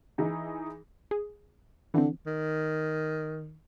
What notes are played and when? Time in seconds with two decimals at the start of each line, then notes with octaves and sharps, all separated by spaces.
0.18 E3 D#4 G#4
1.11 G#4
1.94 D3 E3 C4
2.26 D#3